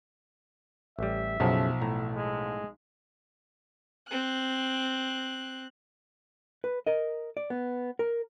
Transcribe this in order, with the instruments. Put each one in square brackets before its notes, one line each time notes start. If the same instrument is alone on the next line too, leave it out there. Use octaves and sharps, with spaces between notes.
[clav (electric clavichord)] A1 G3 [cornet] E5
[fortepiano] B1 F3 [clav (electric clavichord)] F#2 C#3 A4
[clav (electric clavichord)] A2 A#5
[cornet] G#3
[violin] C4 F#6
[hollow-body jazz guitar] B4
A#4 D#5
D5
B3
A#4